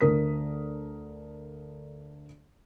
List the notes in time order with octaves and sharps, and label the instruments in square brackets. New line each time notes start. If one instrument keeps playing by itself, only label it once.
[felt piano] D2 D3 A#4 D#6 B6